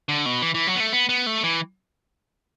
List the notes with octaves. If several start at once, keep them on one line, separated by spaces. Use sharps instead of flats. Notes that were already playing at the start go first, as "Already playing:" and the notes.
D3
B2
E3
E3
F#3
B3
A3
B3
B3
A3
E3